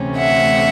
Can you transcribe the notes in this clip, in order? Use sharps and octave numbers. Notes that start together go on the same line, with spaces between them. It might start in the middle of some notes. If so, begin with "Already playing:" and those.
Already playing: D2 C3 E3 A3 C#4
E5 F#5